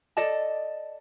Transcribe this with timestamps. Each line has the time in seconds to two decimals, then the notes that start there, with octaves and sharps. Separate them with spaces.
0.17 A4 D5 D#5 A5